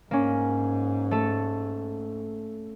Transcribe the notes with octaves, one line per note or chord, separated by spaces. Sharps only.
G#2 A#3 C#4
A3 A4